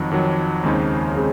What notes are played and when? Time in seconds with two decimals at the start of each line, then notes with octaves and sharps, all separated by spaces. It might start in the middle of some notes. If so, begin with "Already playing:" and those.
Already playing: F2 D#3 F#3
0.11 F2 D#3 F#3
0.63 D#2 C#3 G#3 C4 D#4
1.17 C#3 G#3 C4